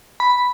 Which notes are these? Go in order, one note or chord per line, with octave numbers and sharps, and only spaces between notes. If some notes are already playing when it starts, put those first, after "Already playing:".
B5